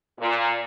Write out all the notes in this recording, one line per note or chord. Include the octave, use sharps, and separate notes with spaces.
A#2